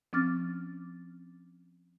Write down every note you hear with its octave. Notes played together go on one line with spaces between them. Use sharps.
F3 C4 C#4 D6 F6 A6